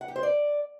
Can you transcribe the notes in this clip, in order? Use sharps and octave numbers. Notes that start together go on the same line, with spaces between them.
F#5
G4
C5
D5